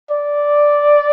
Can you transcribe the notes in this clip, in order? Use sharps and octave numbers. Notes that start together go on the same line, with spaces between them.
D5